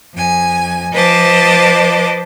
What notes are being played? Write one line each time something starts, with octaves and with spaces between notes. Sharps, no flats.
F2 G#5
F3 B4 C5 D#5 A5 D6